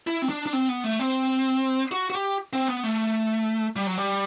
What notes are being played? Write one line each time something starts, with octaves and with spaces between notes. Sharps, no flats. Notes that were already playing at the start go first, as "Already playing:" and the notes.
E4
C4
D4
D4
C4
B3
A3
C4
F#4
F#4
G4
C4
B3
A3
G3
F#3
G3